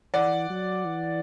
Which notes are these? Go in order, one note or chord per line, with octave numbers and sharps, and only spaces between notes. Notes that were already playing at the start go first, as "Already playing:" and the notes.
E3 D5 F#5
F#3
E3